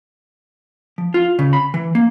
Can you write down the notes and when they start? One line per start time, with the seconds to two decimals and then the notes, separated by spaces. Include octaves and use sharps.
0.98 F3
1.14 F4
1.39 C#3
1.53 B5
1.74 E3
1.95 A#3